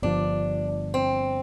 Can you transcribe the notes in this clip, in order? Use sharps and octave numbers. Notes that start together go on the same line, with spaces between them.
G1 G2 D3 F3 D4
C4